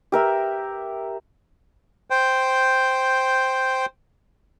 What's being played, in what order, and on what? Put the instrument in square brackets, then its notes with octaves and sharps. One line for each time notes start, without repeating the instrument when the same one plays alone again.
[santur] G4 A#4 E5
[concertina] C5 G5